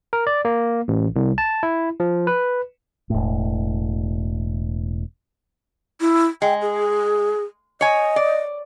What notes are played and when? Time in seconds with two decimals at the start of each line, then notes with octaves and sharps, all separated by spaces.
0.13 A#4
0.27 D5
0.45 A#3
0.88 A1
1.16 C2
1.38 A5
1.63 E4
2.00 F3
2.27 B4
3.10 E1 A2
6.01 E4
6.42 G#3 G5
6.62 G#4
7.81 C#5 D#5 G#5
8.16 D5